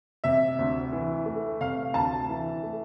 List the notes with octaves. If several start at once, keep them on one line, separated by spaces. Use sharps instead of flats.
C3 E5
D2
E3
A3
C3 F5
D2 A5
E3
A3